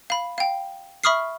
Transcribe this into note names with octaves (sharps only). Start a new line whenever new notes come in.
F5 B5
F5 G5
E5 B5 C#6 D#6 F6 C7